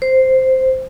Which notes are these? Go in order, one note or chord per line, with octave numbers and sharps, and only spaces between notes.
C5